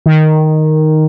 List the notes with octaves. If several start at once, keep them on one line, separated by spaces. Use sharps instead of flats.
D#3